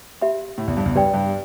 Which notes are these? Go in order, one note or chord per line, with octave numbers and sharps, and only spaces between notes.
G4 E5 B5
A2
E2
G2
E2
G2 G4 B4 D5 G5 B5
G2